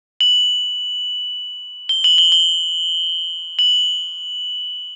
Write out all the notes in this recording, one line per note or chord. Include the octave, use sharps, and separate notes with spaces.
F#7
G7
F#7
G7
G7
F#7